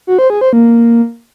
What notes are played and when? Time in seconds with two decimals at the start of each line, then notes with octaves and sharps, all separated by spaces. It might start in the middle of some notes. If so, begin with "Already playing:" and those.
0.07 F#4
0.19 C5
0.30 G#4
0.41 C5
0.53 A#3